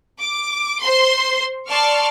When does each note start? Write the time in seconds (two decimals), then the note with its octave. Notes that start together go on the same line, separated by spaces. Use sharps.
0.19 D6
0.81 C5 C6
1.68 D5 A5 C6 C#6 F6